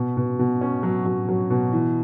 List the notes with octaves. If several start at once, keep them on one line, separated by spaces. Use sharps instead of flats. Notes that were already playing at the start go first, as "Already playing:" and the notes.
Already playing: B2
B2
B2
C#4
F#3
F#3
F#3
B2
E3